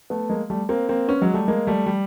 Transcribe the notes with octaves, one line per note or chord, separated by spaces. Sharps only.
A3 B3
G#3 A#3
G3 A3
A#3 C4
A#3 C4
B3 C#4
F#3 G#3
G3 A3
G#3 A#3
G3 A3
G3